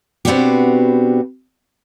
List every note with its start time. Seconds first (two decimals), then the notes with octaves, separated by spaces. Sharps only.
0.25 B2 B3 C4 D4 F#4 G4